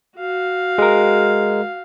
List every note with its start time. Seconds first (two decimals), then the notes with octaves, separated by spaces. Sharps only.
0.17 F#4 F5
0.78 G#3 A#4